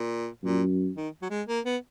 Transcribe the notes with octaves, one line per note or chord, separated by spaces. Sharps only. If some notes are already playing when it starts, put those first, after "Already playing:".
Already playing: A#2
F#2 A#2
D#3
F#3
G#3
A#3
B3